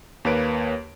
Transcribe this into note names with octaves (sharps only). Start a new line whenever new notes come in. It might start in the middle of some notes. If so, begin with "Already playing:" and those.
D#2 A#3 B4 C#5 D7